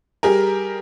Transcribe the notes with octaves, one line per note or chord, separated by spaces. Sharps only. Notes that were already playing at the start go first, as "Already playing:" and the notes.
G3 G4 G#4 A#4